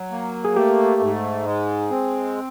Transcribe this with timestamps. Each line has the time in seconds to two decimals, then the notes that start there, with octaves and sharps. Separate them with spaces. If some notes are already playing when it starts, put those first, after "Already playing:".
Already playing: F#3
0.11 A#3
0.45 G#4
0.56 A3 G4
1.01 G#2
1.45 G#3
1.90 C4